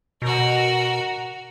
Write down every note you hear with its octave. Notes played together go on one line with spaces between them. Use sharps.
B2 F#4 A#4